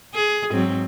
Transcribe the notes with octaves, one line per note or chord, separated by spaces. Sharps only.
G#4
G#2 F#3 C4